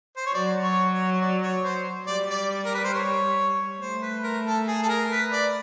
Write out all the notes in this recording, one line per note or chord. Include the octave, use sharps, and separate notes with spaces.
C5
C#5
F#3 D5
C#5
C#5
C#5
D5
C#5
C5
G3 D5
D5
A#4
B4
C5
C#5
A3 C5
B4
A#4
A4
G#4
A4
A#4
B4
D5